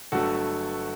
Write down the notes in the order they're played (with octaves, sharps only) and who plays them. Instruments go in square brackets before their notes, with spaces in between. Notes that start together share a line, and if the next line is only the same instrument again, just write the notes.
[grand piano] G1 G2 F#3 A3 F#4 A4